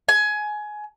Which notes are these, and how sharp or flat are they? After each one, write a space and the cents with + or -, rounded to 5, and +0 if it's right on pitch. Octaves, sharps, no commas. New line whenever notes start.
G#5 +20